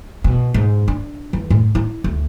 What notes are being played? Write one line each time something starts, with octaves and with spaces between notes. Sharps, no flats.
B2
G#2
D4
E3
A2
E4
D2